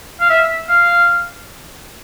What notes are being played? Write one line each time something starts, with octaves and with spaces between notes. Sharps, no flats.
F5
E5
F5